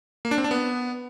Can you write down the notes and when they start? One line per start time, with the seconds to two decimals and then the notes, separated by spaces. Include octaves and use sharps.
0.25 A#3
0.31 D4
0.38 C4
0.44 D4
0.51 B3